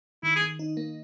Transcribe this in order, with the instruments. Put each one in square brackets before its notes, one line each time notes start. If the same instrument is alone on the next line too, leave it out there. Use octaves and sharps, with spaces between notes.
[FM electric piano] D#3 [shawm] E4
[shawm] G#4
[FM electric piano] D#3
D#4
A#3